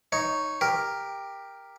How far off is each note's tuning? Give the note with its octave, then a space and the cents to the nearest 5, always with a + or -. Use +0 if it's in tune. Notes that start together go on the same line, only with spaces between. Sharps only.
D#4 +0 C#5 +0
G4 +10 A#4 +0